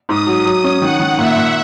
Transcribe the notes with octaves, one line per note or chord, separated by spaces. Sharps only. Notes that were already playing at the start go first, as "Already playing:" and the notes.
G#2 D#6
F#3
F#3 D#6
C#4
D#3 F#5
D#3
A#2 E5
A#2